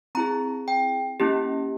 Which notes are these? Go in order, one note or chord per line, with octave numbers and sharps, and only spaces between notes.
C4 E4 G#4 A#5
G5
A#3 C#4 E4 G4